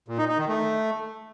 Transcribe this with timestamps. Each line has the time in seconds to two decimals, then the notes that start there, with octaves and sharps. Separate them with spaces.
0.08 A#2
0.18 D#4
0.28 D#4
0.38 D#3
0.48 A3